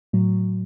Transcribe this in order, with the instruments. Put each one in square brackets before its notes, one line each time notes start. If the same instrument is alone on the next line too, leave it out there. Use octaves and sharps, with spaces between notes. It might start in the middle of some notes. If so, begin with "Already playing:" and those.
[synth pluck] A2 F#3